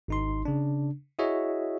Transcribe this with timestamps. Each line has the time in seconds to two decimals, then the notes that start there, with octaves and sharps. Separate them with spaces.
0.08 G#1 D#4 C6
0.45 C#3 D4
1.19 E4 F#4 G#4 C#5 D#5 E5